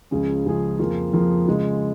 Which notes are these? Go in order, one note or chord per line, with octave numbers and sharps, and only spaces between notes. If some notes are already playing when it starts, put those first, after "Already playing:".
C#2 C#3 F3 C#4 G#4
C#2 C#3 F3 C#4 G#4
F2 F3 A#3 F4 G#4
F2 F3 A#3 F4 G#4
C#3 G#3 F4 G#4